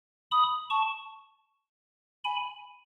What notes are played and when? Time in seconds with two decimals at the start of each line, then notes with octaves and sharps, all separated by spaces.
0.31 B5 D#6
0.70 A5 C#6
2.25 G#5 B5